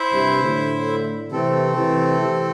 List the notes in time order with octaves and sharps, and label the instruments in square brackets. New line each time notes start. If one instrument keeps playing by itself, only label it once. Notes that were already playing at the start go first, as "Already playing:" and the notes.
Already playing: [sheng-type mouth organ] E4 C5 E5
[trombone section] G2 C3
A2 D3
[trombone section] C3 E3 [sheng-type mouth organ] A3 C4 A4
[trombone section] C3 E3
C3 E3